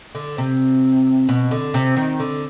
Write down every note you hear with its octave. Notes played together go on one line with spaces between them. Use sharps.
D3
C3
B2
D3
C3
D#3
D3